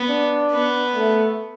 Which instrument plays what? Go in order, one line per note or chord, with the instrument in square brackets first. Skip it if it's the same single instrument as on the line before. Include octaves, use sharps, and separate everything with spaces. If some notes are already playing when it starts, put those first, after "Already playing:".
Already playing: [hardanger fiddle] B3
[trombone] D4
[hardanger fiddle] B3
[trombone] A3